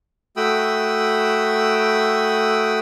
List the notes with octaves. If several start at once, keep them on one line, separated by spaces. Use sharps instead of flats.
A3 F#4 G5 B5 D#6 E6